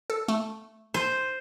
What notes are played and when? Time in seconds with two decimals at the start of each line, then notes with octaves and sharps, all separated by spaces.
0.10 A4
0.28 A3
0.94 C5 D#7